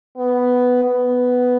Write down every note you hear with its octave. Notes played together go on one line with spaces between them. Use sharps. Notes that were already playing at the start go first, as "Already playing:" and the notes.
B3
B3